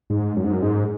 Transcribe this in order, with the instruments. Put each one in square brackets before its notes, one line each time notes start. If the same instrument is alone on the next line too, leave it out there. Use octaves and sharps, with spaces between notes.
[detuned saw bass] G#2
F#2
G#2
F#2
G#2